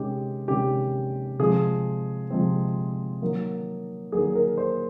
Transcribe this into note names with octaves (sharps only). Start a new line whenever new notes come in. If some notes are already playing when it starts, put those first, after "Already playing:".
Already playing: C3 D#3 G#3 C#4 G4
C3 D#3 G#3 C#4 G4
C3 F3 G#3 C4 G#4
C3 F3 G#3 C4
D#3 F#3 A#3
D#3 F#3 A#3 G#4
A#4
C5